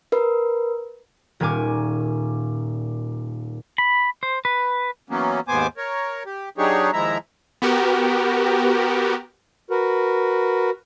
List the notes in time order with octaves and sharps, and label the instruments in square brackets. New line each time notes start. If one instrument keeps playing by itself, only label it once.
[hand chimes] A#4 B4
[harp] D#1 A#2 C#4 G#5 D6
[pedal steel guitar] B5
C5
B4
[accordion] E3 F#3 A#3 B3 C#4
D#2 G#2 B3 C5 G#5 D6
A#4 C#5
G4
F#3 D4 D#4 G4 G#4 C#5
D#2 F3 G#3 E4 E5 A#5
[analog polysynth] B3 F#4 G4 A#4
[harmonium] F#4 A#4 B4